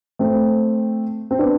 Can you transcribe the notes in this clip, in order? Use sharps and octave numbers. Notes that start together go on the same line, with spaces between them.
A3 C4
C4
B3 D4